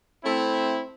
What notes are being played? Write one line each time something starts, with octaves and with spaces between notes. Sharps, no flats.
A3 C4 E4